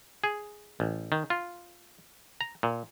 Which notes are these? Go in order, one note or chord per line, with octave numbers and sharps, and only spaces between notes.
G#4
A1
D#3
F4
A#5
A#2